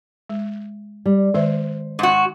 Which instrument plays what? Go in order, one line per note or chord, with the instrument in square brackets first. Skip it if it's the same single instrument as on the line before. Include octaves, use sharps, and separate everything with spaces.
[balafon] G#3
[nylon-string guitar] G3
[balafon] D#3 G#3 E5 [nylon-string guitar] C5
[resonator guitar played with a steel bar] G#2 F#4